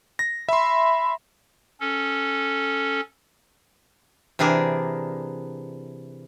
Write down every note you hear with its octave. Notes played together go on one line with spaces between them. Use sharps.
A#6
E5 B5 C6
C#4 A4
C3 E3 D4 G#4 A#4